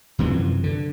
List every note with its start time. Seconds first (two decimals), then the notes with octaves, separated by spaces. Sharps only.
0.19 F#2 C3 E3 F3
0.64 D3